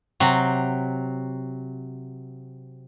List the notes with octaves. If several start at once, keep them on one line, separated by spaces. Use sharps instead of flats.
C3 F#3